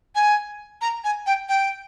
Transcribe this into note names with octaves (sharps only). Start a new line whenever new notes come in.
G#5
A#5
G#5
G5
G5